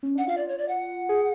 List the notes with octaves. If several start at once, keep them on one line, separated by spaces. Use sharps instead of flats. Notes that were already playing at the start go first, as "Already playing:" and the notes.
C#4
D4 F#5
F4 F5
D5
C#5
D5
F#5
G#4